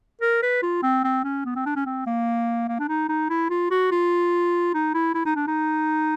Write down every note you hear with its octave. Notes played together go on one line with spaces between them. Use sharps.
A#4
B4
F4
C4
C4
C#4
B3
C4
D4
C#4
C4
A#3
A#3
D4
D#4
D#4
E4
F4
F#4
F4
D#4
E4
E4
D#4
D4
D#4